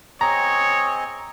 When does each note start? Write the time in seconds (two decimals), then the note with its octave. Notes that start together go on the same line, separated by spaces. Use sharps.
0.21 C4 G#4 C#5 D#5 A#5